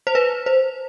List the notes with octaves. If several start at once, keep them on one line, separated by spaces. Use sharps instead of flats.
C5
B4
C5